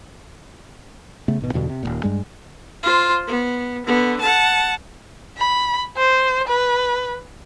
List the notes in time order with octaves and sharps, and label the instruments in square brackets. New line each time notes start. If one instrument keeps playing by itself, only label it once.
[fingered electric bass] C#3 A3 B3
G#1 B2
E2 G2 B2 D3
C3
D#1 G#1 A#2
G2 G3 G#3
[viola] F4 C5
B3
D3 B3
F#5 A5
[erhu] B5
C5
B4